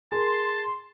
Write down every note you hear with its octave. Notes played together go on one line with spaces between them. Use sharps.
G#4 A#4 A5 C6